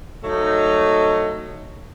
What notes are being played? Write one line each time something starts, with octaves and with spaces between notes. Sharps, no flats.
F#3 A3 D#4 A4